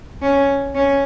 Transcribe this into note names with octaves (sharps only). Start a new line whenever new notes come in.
C#4
C#4